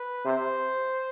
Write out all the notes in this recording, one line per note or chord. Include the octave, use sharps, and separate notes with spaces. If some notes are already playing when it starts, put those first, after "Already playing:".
Already playing: B4
C3 C5